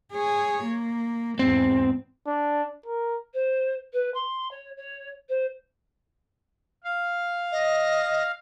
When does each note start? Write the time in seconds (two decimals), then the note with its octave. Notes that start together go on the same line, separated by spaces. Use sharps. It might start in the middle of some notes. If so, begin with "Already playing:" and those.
0.13 G#4 C#5
0.65 A#3
1.39 E2 G#2 C4
2.27 D4
2.86 A#4
3.33 C5
3.93 B4
4.14 C6
4.51 C#5
4.77 C#5
5.28 C5
6.84 F5
7.52 D#5